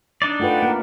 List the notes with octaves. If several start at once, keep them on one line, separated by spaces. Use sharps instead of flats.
D4 D#4 D5
A3 F4 B4 F#5 G5
A#3 A#4